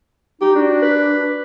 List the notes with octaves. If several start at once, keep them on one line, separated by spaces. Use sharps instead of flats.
D#4 G4
D4 F#4
B4